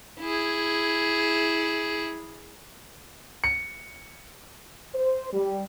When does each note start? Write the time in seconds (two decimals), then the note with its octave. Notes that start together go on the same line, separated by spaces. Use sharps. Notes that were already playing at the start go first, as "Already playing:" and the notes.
0.20 E4 G#4
3.44 C#7
4.95 C5
5.32 G3